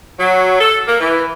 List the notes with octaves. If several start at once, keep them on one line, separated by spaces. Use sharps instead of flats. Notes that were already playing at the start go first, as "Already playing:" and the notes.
F#3
A4
A#3
E3